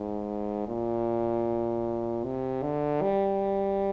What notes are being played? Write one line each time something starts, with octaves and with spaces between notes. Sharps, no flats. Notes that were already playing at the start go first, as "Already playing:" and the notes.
Already playing: G#2
A#2
C3
D3
G3